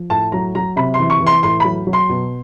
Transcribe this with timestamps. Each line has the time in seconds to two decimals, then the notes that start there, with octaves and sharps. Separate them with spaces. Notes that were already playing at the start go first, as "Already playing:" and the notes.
Already playing: F3
0.10 A2 A5
0.32 F#3 A#5
0.55 F#3 A#5
0.76 C3 B5
0.94 C6
0.99 E3
1.10 C#6
1.20 E3
1.27 C6
1.43 A2 C6
1.60 F#3 B5
1.87 F#3
1.93 C6
2.09 B2